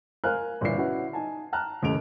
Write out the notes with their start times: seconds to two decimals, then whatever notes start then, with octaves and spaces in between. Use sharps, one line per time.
0.24 A#4 C5 F5 G#5 F6 F#6
0.61 G1 A#2 E3 D5 E5 C7
0.78 C#4 E4 F#4 B4
1.13 D#4 G#5 A5
1.53 G5 A5 A#5 F6 F#6
1.82 F1 D#2 A2 C#3 D7 F7